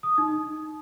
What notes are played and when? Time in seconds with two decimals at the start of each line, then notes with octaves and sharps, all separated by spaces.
0.03 D#6
0.18 D#4